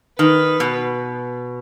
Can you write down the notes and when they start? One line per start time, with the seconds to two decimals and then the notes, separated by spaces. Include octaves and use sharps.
0.19 D#3 B4
0.60 B2